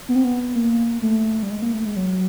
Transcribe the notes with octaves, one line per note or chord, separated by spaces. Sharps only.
B3
C4
B3
A#3
A3
G3
G#3
A#3
A3
G#3
F#3